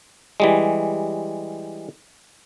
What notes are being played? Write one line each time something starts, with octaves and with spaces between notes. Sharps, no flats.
E3 G3 G#3